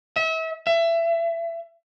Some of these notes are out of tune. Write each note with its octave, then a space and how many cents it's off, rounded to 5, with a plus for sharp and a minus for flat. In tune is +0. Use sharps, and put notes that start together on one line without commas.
E5 -35
E5 +25